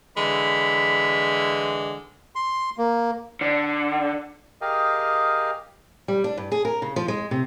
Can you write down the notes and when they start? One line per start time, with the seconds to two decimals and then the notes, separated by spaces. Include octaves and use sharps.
0.17 D3 E3 G#3 B5
2.35 C6
2.78 A#3
3.41 D3
4.61 G4 G#4 A#4 D#5 F5 G5
6.08 G3
6.24 D4
6.37 G2
6.52 G#4
6.65 A#4
6.82 C#3
6.96 F3
7.08 G#3
7.31 C3